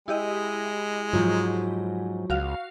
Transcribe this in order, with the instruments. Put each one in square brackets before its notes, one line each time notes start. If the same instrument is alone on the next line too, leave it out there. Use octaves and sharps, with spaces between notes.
[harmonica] G#3 [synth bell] E4 G4 D#5
[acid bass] G#2 [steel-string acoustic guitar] F3 F#3
[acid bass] C#2 [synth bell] F#4 F5